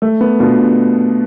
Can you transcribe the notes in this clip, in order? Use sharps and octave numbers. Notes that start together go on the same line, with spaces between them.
A3
B3
B2 D4 F4